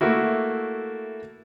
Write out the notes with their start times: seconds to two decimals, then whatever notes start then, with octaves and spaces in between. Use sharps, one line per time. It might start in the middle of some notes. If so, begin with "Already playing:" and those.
0.01 A3 A#3 E4 F#4